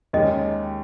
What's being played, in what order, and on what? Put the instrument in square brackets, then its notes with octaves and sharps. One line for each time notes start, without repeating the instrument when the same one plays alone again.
[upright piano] D#2 D#3 G#3 C#4 [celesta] D#5